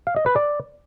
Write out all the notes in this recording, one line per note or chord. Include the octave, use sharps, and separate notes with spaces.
F5
D#5
B4
D5